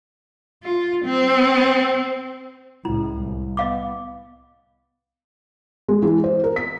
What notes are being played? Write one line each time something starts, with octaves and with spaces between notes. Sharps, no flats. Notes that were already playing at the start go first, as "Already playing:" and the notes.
F4
C4
C#2 A2 E4
C2
B3 D#5 F5 D6
G#3
E3
C5
A#4
B6